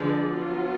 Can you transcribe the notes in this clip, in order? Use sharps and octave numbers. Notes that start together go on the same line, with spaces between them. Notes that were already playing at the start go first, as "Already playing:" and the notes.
Already playing: D3 F3 G#3 D4 G#4 B4 D5
F#3 B3 F4